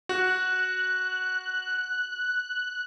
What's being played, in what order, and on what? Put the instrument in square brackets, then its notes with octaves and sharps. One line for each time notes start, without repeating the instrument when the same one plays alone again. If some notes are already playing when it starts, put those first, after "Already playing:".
[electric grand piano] F#4 [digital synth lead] F#6